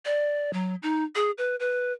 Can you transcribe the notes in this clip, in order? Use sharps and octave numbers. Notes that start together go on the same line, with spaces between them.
D5
F#3
D#4
G#4
B4
B4